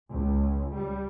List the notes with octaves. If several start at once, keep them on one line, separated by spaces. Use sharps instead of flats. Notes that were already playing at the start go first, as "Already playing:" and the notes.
C#2
G3